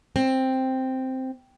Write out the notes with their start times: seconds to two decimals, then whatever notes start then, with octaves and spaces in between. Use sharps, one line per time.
0.16 C4